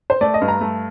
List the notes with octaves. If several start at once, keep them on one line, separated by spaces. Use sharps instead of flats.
C5
A3 D5
D#5
G2
A#5
A3